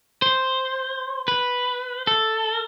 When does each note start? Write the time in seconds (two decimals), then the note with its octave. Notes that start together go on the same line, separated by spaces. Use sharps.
0.22 C5
1.28 B4
2.07 A4